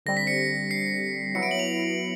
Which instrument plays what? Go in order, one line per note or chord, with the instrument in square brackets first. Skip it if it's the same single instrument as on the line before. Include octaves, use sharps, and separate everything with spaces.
[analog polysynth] D3 G3 C4 [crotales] A#6
[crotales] B6
C#7
C7
[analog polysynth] F#3 B3 E4 [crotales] C#7
[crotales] D7
F#7
F7